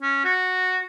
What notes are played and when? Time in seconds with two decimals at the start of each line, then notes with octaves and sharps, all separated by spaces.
0.02 C#4
0.25 F#4